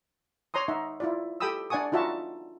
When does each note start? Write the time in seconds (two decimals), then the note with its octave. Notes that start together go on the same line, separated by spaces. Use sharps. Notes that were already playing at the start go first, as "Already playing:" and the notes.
0.54 C#5 A#5 C6 D#6
0.68 D#4 E5 F#5
1.00 E4 F4 D5
1.40 G4 A4 G5 B5 D#6 E6
1.70 D4 D5 F#5 G#5 C#6 D#6
1.92 D#4 F4 F#4 E5 A5